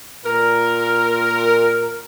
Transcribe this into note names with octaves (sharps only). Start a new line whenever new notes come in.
A#2 A#4